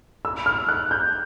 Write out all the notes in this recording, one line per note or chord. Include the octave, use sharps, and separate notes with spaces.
E6
F6
F#6
G6